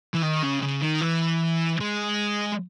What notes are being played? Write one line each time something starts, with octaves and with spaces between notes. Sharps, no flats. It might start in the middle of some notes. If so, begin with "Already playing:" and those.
E3
D#3
C#3
C#3
D#3
E3
G#3